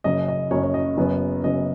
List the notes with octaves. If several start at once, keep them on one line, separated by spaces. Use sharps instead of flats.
F#1 F#2 C#3 D#5
D#5
F#1 F#2 C#3 C#5
C#5
D#5
F#1 F#2 C#3 B3
F#1 F#2 C#3 B3 D#5